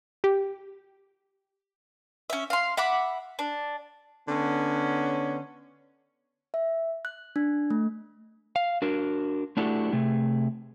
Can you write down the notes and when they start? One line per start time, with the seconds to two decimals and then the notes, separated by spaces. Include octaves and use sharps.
0.24 G4
2.30 C#4 E5
2.50 F5 C6
2.77 E5 F#5 B5 D6
3.39 D4
4.28 D3 B3 C#4
6.54 E5
7.05 F#6
7.36 D4
7.70 A3
8.56 F5
8.82 D4 F#4 A#4
9.57 A3 D4 E4 F#4 G4 A4
9.92 C3 A3 G#4